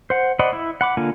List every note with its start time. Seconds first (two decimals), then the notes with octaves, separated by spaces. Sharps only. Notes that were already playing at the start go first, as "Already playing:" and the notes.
0.10 C5 F#5
0.39 C5 D5 D#5 F#5 B5
0.53 E4
0.81 F#5 B5 D6
0.97 D3 A#3 F4 G#5